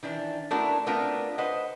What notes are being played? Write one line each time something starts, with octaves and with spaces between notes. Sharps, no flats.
D#3 E3 D4
A3 B3 D4 E4 F#4 A#4
A3 B3 C4 D4 F4 A#4
B4 C5 D#5 F#5